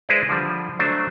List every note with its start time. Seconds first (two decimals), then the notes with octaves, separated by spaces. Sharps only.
0.09 G#3 E4 G#4 B4 C5 D5
0.29 D3 F3 G3
0.79 F#3 A3 D4 C5